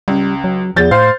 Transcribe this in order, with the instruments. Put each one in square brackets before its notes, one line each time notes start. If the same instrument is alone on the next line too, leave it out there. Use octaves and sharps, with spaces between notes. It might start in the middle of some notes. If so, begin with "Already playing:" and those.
[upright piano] C#2 [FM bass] G3
[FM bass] F#3
[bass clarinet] E2 [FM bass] F3 [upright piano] G6 A6
[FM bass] A2 [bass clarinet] C5 [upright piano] F5